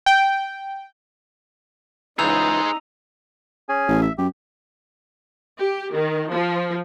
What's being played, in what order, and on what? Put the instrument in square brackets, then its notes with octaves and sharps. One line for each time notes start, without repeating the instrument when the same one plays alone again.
[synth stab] G5
[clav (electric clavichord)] C#2 E3 [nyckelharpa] D#4 [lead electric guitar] G#4 C5 [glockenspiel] A#5 E6 F7
[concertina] C#4 G#4 G#5
[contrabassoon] A1
[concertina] E5
[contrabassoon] F#2 [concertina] G4
[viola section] G4
D#3
F3